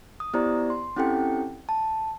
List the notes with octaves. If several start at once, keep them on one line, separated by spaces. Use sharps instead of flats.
D#6
B3 E4 G4 C5 D5 A#5
C6
C4 C#4 E4 G4 A4 G5
A5